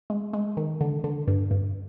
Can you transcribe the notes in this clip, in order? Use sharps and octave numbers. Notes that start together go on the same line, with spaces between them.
G#3
G#3
D#3
D3
D3
G2
G2